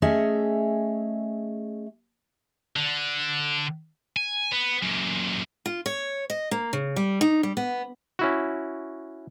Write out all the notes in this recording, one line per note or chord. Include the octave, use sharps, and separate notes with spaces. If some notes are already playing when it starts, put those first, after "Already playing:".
A3 C#4 G#4 D#5 E5
D3
G#5
B3
F#2 A#2
F4
C#5
D#5
A#3
C#3
G3
D#4
G3
B3
C#4 E4 F#4